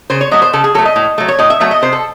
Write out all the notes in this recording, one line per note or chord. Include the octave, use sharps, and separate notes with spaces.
C#3 C5
C#5
F#3 A3 D#5
C5
C#3 A4
G#4
F#3 A3 A4
D#5
A2
F#3 A3
C#5
A2 D#5
E5
F#3 A3 E5
D#5
C3 C5
A4